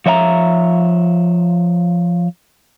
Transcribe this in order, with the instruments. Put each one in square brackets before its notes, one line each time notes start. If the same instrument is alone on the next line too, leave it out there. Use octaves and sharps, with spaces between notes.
[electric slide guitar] F3 C#5 E5 G5 A#5